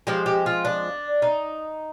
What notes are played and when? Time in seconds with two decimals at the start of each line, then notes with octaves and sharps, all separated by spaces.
0.07 F3 G#3 C4 G4
0.26 G4
0.46 F4
0.65 D4
1.22 D#4